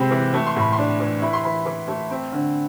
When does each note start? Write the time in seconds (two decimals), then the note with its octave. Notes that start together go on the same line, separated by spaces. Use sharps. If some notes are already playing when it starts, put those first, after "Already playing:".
Already playing: C3 G#3 C4 B5
0.11 E3
0.34 A3
0.46 C6
0.56 A2 B5
0.73 C6
0.78 D4
1.00 E3
1.21 E4 B5
1.33 C6
1.43 E3 B5
1.66 E3
1.88 A3
2.11 C4
2.32 D3